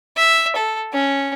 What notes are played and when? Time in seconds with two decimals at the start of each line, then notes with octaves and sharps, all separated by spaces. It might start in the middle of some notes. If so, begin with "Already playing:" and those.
0.17 E5
0.56 A4
0.93 C#4